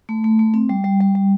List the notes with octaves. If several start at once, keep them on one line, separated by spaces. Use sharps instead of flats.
A3
A3
A3
C4
G3
G3
G3
G3